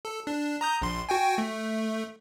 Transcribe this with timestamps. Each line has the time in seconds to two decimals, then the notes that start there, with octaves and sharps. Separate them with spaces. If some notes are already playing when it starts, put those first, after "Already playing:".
0.05 A4
0.27 D4
0.61 A#5 D#6 G6
0.82 A#1 C6
1.09 F#4 G5 G#5
1.38 A3